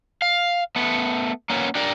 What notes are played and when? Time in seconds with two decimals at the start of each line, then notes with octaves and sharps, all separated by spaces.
0.22 F5
0.76 A3 B3
1.50 A#3 B3 C#4
1.75 D4 G4 A#4 D5